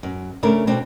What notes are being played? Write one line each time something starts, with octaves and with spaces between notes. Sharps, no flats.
F#2
C#3 A3 D4 A#4
B2 C4 D4